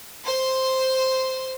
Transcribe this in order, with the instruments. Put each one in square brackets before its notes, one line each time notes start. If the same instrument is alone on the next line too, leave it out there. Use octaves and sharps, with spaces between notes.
[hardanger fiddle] C5 C6